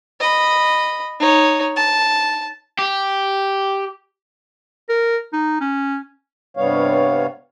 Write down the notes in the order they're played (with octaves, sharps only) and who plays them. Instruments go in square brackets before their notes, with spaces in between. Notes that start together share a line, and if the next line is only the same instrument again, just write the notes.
[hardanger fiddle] D#5 B5
D#4 C#5
A5
[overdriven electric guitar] G4
[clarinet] A#4
D#4
C#4
[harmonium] G2 C3 G3 B3 C#5 F5